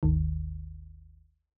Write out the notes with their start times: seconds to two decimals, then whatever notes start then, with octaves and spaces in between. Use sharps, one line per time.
0.03 G#1 D#2 D#3